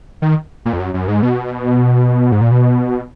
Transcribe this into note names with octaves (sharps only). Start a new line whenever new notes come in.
D#3
A#2
F2
F#2
F#2
G#2
B2
G#2
A#2
B2